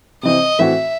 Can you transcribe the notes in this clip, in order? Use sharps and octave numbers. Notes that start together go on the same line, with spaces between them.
C3 E3 C4 D#5
A2 E3 C4 F#4 E5